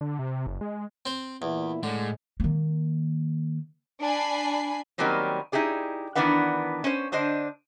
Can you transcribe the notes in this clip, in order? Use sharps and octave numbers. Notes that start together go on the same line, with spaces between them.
D3
C3
F#1
G#3
C4 C5
E2 A#2 B3 E4
A2 D3 G#3
D#3 A#3
D4 G#5 B5 C7
D#3 F#3 G3 A#3 C4 C#4
D#4 E4 G4 G#4 D5
D#3 E3 B3 D4 B4 F#5
C#4 C5
D3 D4 C5 D#5